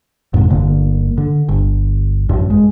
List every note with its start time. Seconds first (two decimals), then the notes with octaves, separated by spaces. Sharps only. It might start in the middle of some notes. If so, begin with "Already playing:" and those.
0.34 F2 G#2 C3
0.50 G1 D3 A#3
1.18 D3
1.49 G1
2.29 A1 F#2
2.50 G#3